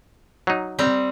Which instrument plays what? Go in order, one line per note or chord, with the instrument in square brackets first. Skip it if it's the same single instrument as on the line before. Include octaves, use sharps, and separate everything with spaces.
[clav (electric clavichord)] F#3 D#4
[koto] G3 C4 A#5